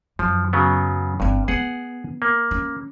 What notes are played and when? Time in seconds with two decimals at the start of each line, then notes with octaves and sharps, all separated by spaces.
0.19 F#2 F3
0.53 C#3 F#3 B3
1.20 G1 G2 C4
1.48 B3 G#4 F#5
2.22 A#3
2.51 C#4